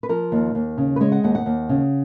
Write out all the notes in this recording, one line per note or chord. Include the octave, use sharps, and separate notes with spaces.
B4
F3 A#4
D#2
D#2
C#3
B4
G#3 C#5
F#5
D#2 F#5
F#5
D#2
C#3